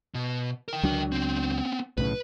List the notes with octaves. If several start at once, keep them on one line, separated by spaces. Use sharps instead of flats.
B2
A#4 G5
C#2 F#3 D4
B3 C4
B1 A2 C#3 B4